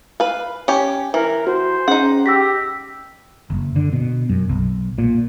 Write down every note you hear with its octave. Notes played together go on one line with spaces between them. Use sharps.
B4 F5
C#4 G4
E3 A#4
F#4 C5
C#4 D#4 G#4 F#5
G4 E6 A#6 B6
F#1
D3
B2
F#2
B1
A#2